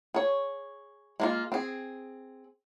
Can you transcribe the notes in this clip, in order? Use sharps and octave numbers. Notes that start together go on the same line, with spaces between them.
G#4 C#5
G#3 A#3 F4
C4 G#4